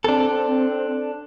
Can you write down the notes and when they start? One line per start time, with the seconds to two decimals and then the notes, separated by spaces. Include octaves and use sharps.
0.04 C4 D4 A4